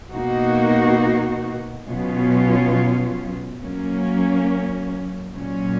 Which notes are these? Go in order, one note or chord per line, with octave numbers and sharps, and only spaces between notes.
B2 A#3 D#4 F#4
B2 F#3 C#4 F4
F#3 A#3 C#4
A#2 F#3 C#4